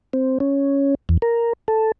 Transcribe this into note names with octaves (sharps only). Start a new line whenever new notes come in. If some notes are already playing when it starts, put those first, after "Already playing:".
C4
C#4
E2
A#4
A4